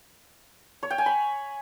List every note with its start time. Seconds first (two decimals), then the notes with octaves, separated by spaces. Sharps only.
0.83 C#5
0.90 G5
0.98 G#5
1.06 B5